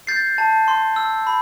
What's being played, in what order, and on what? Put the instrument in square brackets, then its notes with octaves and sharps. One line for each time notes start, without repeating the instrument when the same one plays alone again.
[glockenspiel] G6 A6 C7
A5
C6
E6
B5